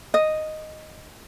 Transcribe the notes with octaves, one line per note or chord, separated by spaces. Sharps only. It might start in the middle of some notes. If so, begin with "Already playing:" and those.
D#5